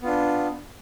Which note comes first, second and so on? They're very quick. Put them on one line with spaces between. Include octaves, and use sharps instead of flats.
B3 F4 D4